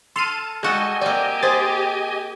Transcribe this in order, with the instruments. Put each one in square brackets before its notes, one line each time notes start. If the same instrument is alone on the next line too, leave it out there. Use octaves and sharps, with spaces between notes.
[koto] A4 [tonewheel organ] A5 [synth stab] C6 F6 D#7
[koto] G3 F#4 A4 [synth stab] G#3 [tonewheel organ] D#5 G#5
[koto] A#3 C4 [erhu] G4 [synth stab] D5
[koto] G#4 [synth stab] C5 A6